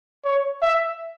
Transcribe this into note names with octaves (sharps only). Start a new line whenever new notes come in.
C#5
E5